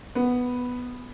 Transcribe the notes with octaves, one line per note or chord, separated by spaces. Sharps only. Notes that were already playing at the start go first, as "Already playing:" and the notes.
B3